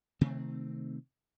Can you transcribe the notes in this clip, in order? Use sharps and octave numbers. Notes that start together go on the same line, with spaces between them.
C3 D#3 A3 C4